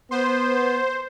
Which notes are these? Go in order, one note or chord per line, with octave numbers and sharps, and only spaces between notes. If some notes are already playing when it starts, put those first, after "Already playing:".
B3 C5